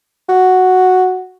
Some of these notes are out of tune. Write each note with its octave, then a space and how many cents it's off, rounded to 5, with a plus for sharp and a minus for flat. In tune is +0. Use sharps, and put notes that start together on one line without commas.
F#4 +0